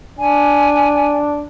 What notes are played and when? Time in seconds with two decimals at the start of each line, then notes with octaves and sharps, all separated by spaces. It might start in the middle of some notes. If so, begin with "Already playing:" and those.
0.19 D4 G#5